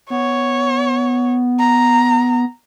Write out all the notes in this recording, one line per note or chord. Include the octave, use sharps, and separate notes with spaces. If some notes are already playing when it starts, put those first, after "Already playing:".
B3 C#5
A#5